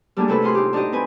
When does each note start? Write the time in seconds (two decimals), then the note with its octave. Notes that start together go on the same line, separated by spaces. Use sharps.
0.17 G3 A3 A#3 D4 F#4 G#4
0.28 C3 A3 E4 F#4 A4 B4
0.42 A2 E4 F4 G#4 C6 F#6
0.55 D#4 G4
0.73 D4 D#4 F#4 G4 D#5
0.92 C4 B4 G#5